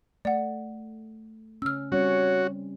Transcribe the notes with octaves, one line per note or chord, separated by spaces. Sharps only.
A3 D5 F#5
C#3 C#4 E6 F6
G3 C4 C#4 F#4 C#5